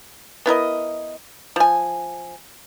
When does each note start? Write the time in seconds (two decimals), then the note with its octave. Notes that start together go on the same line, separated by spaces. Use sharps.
0.46 B3 E4 A#4 D#5
1.56 F3 G#5